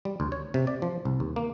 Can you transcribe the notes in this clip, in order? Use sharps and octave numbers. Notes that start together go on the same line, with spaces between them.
G3
D2
C#5
C3
D5
F3
C2
D#2
A#3